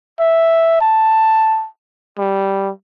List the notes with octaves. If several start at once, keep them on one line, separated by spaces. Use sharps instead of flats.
E5
A5
G3